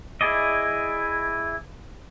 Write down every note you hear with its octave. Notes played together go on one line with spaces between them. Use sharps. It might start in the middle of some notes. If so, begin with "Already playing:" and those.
E4 G#4 D5 D#5